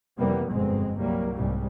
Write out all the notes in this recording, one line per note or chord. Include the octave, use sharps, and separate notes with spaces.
F2 C3 E3 G3 A#3 B3
G1 F2 G#2 B2 G#3 C4
C2 F#3 G3 A#3
C2 G#2 G3